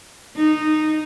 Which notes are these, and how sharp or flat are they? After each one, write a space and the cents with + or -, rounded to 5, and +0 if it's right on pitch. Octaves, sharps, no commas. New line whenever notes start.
D#4 -15